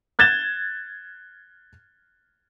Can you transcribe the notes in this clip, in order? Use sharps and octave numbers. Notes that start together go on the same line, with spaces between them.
F#6 G#6 A6 E7 G7